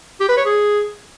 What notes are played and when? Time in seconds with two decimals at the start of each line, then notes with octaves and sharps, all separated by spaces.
0.21 G4
0.29 B4
0.37 C#5
0.45 G#4